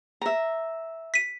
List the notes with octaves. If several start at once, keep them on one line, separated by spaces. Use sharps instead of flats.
E5 A#5
B6 D#7